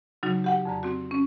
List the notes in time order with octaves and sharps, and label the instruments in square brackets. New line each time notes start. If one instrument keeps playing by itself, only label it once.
[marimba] C#3 F#3 D#4 F#4
G4 F#5 G5
F2 D3 A#5
C4 F#4
C#4